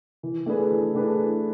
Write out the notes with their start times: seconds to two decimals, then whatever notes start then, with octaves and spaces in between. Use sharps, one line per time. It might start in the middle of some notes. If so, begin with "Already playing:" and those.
0.23 E3
0.46 A3 D4 G#4 B4
0.71 E3
0.95 A3 D4 G#4 B4
1.19 E3